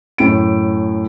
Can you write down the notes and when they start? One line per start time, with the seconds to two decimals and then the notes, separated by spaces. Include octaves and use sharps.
0.18 F#2 A2 D7